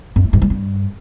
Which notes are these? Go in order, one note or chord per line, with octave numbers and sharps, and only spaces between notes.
F#2
A3
G2
G3
G2